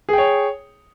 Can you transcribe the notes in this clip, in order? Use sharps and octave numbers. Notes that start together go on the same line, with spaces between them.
G#4 C#5 G5